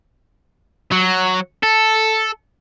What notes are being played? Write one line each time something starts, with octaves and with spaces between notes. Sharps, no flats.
F#3
A4